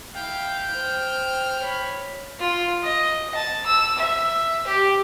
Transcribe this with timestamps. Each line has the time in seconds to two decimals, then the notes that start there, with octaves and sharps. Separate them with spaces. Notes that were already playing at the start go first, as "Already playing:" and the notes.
0.15 E4 F5 G5
0.71 C5 F6
1.60 C#5 B5
2.39 F4
2.82 D#5
3.35 A5
3.66 E6
3.98 E5
4.67 G4